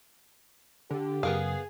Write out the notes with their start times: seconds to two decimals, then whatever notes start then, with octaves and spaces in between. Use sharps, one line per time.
0.91 D3 G4
1.23 F#2 C#3 B3 G#4 A#4 F5